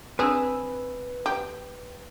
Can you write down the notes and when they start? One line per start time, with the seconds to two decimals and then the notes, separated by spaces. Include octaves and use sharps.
0.19 C4 D4 G#4 B4 E6
1.26 G4